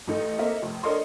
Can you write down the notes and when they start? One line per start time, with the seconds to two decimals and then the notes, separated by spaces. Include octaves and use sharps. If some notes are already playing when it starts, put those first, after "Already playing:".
0.07 A1 D#4 A4
0.39 A#3 C4 A4 A#4 D#5 E5
0.62 F1
0.83 D4 A4 A#4 C#5 D#5 C6